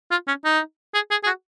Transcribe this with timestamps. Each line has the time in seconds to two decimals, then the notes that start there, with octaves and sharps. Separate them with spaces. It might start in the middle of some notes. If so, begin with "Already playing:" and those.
0.11 F4
0.28 C#4
0.45 D#4
0.94 G#4
1.11 G#4
1.24 G#4
1.27 F#4